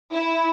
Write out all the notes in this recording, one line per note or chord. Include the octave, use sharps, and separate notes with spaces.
E4